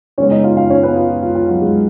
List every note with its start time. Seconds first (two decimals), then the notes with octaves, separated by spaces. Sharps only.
0.18 C#3 G#3 B3 C#4 C#5
0.31 D#4 D#5
0.44 F4 F5
0.57 F4 F5
0.70 C#4 C#5
0.83 B3 B4
0.96 F4
1.10 F4
1.22 F4
1.35 F4
1.49 F#3 F#4
1.62 G#3 G#4